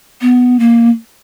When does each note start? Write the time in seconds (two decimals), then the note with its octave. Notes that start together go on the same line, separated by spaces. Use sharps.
0.21 B3
0.59 A#3